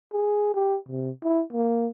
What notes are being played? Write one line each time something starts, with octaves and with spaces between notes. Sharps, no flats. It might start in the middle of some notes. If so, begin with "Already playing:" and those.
G#4
G4
C3
E4
A#3